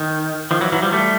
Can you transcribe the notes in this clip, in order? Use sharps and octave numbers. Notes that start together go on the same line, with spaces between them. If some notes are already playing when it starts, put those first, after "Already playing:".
Already playing: D#3
D#3 F3
E3 F#3
E3 F#3
F3 G3
G3 A3